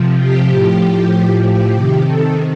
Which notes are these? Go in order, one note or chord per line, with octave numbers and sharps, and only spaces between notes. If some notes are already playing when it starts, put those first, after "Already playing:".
Already playing: C3 F3
G4
A2 F3
G4
C3 D#3
A4